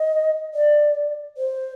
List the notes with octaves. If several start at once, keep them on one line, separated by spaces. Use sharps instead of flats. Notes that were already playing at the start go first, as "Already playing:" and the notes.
Already playing: D#5
D5
C5